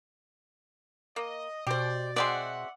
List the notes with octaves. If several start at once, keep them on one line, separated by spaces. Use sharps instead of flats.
A#3 D#5
B2 G4 C5 D5
G#3 C4 F#4 D5 E5 F#5 C6